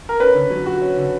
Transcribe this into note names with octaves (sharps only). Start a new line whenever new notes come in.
A#4
C#4 B4
D3
F#3
F#4
C#4
D3